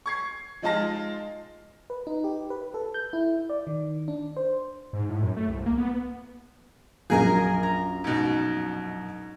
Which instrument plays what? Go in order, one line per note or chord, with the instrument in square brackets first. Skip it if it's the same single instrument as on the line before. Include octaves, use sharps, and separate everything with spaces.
[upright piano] C#6 G#6 C7
F3 G#3 D#4 F4 A5 A#6
[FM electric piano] B4
D#4
G4
B4
A4
G6
E4
D5
D#3
D4
C5
[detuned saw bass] G#2
A2
F#2
A3
C2
A#3
B3
[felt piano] A#1 F#2 [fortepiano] G#4 A#4 G#5
[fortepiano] A#5
G#2 B2